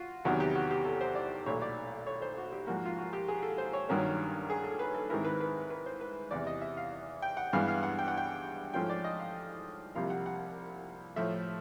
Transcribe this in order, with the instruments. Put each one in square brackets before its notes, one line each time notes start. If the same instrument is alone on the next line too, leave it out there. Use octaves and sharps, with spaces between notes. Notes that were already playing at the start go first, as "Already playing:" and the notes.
Already playing: [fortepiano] F4 F#4
E2 C3 D#3 F#3 B3 F#4
G4
F#4
G4
A4
C5
D5
B1 A#2 F#3 A3 C#5
D5
C#5
C5
F#4
G4
G#2 F3 A#3 F#4
F4
F#4
G4
G#4
A4
C5
C#5
G2 D#3 F#3 A#3 C#4
G#4
A4
B4
A4
G#2 D#3 G#3 C4 E4 A#4
B4
B4
B4
C5
B4
E2 C3 E3 D5
D#5
E5
F5
G5
F#5
G2 E3 G#3 B3 F5
F5
F#5
G5
F#5
G5
G#2 F3 A3 C#4 F4 G5
D5
D#5
F5
C2 C3 F3 A#3 F5
F#5
F#5
A2 F3 A3 E5